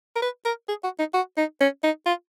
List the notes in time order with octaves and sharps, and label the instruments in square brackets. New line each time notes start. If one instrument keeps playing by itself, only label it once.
[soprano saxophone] A#4
B4
A#4
G#4
F#4
D#4
F#4
D#4
C#4
D#4
F4